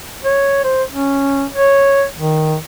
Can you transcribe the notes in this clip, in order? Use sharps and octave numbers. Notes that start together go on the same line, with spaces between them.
C#5
C5
C#4
C#5
D#3